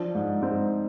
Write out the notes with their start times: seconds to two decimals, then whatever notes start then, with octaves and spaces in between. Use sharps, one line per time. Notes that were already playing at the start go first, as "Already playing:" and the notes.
Already playing: F3 D4
0.15 G#2
0.41 G#2 C4